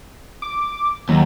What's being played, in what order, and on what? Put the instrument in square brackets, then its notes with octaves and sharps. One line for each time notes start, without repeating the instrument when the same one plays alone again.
[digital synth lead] D6
[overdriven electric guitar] D#2 [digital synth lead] F#3